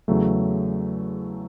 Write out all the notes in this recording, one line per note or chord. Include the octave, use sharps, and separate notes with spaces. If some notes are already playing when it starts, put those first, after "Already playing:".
E2 C#3 F#3 A3